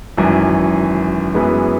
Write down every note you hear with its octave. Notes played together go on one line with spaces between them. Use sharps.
G#1 F#2 E3
F#2 E3 G#3 B3